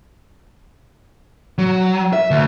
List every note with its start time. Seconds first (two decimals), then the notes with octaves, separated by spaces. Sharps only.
1.58 F#3
2.13 E5
2.31 D2